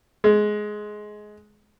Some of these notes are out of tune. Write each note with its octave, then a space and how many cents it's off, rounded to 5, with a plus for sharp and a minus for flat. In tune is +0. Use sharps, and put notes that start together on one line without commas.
G#3 +15